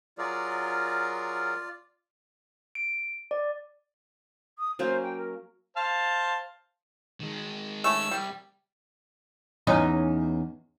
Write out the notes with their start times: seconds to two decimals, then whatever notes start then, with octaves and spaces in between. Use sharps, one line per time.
0.18 F#3 F4 G#4 A#4 D5
2.75 D7
3.31 D5
4.58 D#6
4.79 F#3 A#3 C#4 C5
5.03 G5
5.18 A#4
5.77 C5 F5 A5
7.20 D#3 G#3
7.84 A3 C#4 E6
8.11 C2 G3
9.67 E2 C#4 D#4